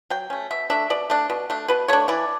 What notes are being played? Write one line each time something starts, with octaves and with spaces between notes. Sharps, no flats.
F#3 G5
A3 C#4
B2 E5
A3 D4 E5
B2 D5
A3 D4
B2
A3 D4
B2 B4
A3 D4 C#5
E3 D5